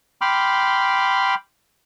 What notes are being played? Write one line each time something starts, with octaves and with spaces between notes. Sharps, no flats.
G5 B5 C6 D6 F6